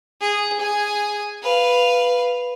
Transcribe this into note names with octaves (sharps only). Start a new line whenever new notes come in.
G#4
G#4 G#5
B4 F5